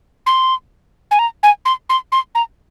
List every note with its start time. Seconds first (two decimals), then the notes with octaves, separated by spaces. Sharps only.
0.26 C6
1.11 G#5
1.19 A#5
1.43 G#5
1.65 C6
1.90 C6
2.12 C6
2.35 A#5